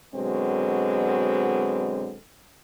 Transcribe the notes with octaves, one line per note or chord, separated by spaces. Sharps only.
B2 D3 F#3 G#3 C4